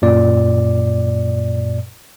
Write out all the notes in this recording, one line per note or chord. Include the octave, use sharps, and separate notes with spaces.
F#2 A#2 D5